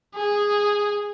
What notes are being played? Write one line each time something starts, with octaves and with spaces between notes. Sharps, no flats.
G#4